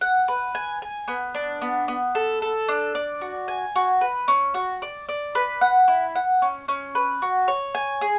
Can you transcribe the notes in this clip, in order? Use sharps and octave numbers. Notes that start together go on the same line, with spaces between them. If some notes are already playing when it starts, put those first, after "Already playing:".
F#5
B4
G#5
G#5
B3
D4
B3
B3
A4
A4
D4
D5
F#4
G#5
F#4
B4
C#4
F#4
D5
D5
B4
F#5
E4
F#5
C#4
C#4
B4
F#4
C#5
G#5
G#4